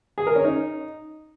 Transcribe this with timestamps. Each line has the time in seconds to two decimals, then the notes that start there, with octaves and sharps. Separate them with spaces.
0.18 G#4
0.27 A#4
0.36 C#4
0.45 D#4